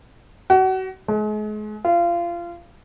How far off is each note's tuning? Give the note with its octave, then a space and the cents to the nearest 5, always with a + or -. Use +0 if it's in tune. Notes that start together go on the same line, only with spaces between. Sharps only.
F#4 +30
G#3 +40
F4 -25